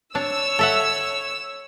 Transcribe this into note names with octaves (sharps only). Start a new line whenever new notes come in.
D4 C#5 E6
A4 E5 F#5